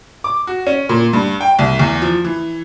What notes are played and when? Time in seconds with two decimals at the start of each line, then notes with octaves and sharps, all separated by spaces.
0.24 D6
0.47 F#4
0.67 C#4
0.89 A#2
1.13 G2
1.41 G5
1.59 C2
1.80 E2
2.02 F3
2.25 E3